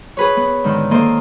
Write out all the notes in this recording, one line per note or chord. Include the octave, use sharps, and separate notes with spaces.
G#4 B4 C#5
B3
G#2 D3 D#3
A#3 A4 A#4 C5 D#5